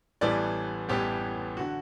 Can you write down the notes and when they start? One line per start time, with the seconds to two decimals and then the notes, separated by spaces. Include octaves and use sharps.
0.21 A1 A2 E3 G3 B3 D5
0.89 A1 A2 E3 G3 B3 G4
1.57 D3 F#4